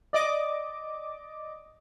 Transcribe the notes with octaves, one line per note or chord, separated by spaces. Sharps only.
D5 D#5 D6